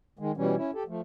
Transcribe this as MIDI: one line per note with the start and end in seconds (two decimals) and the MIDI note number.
0.19 0.32 51
0.19 0.32 56
0.37 0.56 47
0.37 0.56 52
0.37 0.56 55
0.37 0.56 61
0.57 0.71 61
0.57 0.71 64
0.74 0.84 67
0.74 0.84 69
0.88 1.01 53
0.88 1.01 57